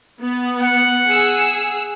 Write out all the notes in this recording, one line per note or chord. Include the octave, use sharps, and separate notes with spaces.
B3
F#5
G#4 E6